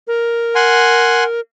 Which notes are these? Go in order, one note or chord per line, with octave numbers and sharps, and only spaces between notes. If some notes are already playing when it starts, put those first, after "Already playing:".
A#4
F#5 G#5 C6